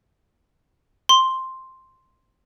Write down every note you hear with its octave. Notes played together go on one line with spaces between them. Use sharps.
C6